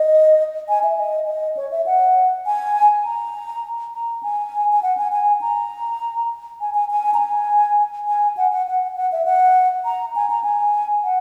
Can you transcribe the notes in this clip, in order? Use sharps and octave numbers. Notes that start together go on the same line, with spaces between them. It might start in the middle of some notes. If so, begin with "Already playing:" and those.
Already playing: D#5
G#5
E5
D#5
D#5
C#5
E5
F#5
G#5
A#5
A#5
G#5
G#5
F#5
G#5
G#5
A#5
G#5
G#5
G#5
A#5
G#5
G#5
F#5
F#5
F#5
F#5
E5
F#5
A#5
G#5
A#5
G#5
F#5